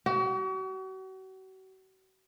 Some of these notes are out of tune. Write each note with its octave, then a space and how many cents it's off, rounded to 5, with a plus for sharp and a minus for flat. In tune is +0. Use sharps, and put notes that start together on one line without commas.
F#4 +40